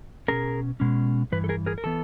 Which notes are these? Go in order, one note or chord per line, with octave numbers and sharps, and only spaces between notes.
B2 G#3 C#4 G#4 A#4
B2 G#3 C#4
G2 E3 B4
A4
G#4 A#4
G#4 A#4
A#4
E3 B3 A4